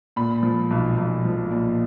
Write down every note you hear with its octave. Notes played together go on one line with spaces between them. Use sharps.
A#2 B5
F3
B1
B1
F3
A#2